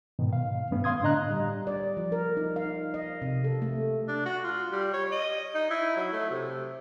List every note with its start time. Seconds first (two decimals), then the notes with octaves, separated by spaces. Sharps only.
0.19 G#2 B2 D#3
0.33 F5
0.71 G2 D#3 A3 B3 C#4
0.84 F5 C6 D#6 G#6
1.02 A2 D3 D4 D#5 A#5 F#6
1.31 G3
1.67 D5
1.97 F3
2.12 A#4
2.37 D#4
2.56 F5
2.94 D#5
3.22 C3
3.44 A4
3.62 A3
4.08 D4
4.26 F#4
4.44 F4
4.71 G3
4.94 C#5
5.12 D#5
5.55 D#4
5.71 E4
5.97 F#3
6.12 A3
6.31 C3